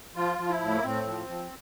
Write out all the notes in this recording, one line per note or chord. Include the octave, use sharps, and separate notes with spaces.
F3 F4
F3
E4
A2
A3
A#3
A2 C4
F3
F3